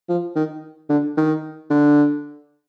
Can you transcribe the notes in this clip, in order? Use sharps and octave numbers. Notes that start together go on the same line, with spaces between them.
F3
D#3
D3
D#3
D3